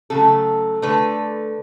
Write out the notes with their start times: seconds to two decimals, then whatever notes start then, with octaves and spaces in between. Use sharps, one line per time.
0.10 C#3 F#3 A3 A4
0.82 D3 A3 B4